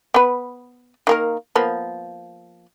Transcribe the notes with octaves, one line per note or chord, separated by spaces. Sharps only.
B3 B4
D#3 A#3 A#4
F3 A#3 B3